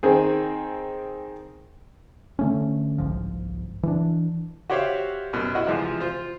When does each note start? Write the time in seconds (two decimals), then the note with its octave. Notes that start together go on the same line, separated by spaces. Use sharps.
0.03 D#3 C4 G#4
2.39 D3 A3 C#4
2.98 G1 C2 G#2 F3
3.83 E3 D4
4.70 F#4 G4 C5 C#5 E5 F5
5.33 F#2 B2
5.55 E4 F#4 D#5
5.67 C3 E3 F3 G#3 F4
6.00 F4 C5